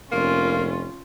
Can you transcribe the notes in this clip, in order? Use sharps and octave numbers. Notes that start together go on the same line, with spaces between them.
F1 A#3 C#4 F4